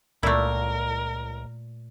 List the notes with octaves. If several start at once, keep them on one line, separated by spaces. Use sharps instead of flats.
C#2 A#2 A3 E4 A#4 F5